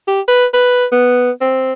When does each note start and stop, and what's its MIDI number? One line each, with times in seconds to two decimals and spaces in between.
0.08 0.20 67
0.28 0.45 71
0.54 0.85 71
0.92 1.31 59
1.41 1.73 60